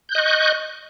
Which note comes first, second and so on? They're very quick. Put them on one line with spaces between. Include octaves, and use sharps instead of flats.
G6 F#6 D#5 C#6